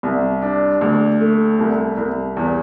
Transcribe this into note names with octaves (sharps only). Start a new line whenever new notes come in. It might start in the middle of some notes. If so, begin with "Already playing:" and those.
C2
D4
D2
A3
C2
C2
E2